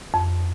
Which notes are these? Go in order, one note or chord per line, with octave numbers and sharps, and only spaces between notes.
F2